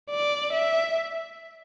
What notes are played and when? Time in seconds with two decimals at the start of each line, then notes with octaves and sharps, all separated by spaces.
0.10 D5
0.53 E5